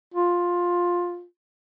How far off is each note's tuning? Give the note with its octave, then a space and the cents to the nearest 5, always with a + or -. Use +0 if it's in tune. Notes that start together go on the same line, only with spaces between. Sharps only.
F4 +10